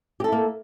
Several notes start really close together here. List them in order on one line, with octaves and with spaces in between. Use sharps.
G4 A4 E4 A#3